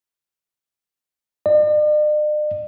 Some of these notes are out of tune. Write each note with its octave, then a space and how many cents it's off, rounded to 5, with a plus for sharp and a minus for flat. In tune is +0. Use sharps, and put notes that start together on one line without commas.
D5 +45